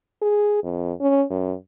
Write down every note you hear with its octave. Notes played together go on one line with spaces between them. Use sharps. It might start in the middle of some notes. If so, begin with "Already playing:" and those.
G#4
F2
C#4
F#2